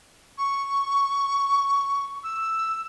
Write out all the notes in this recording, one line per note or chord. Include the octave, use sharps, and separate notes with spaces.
C#6
E6